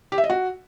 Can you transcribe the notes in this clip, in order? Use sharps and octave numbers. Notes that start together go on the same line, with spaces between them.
G4
E5
D#5
F#4